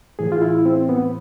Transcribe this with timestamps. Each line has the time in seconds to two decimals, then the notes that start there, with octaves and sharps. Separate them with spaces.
0.19 A2 E3 G#4
0.32 F4
0.42 E4
0.66 C4
0.89 B3